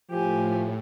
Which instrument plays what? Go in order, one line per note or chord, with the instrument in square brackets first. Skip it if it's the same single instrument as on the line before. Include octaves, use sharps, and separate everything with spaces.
[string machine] A2 [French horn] F3 [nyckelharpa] G4 G#5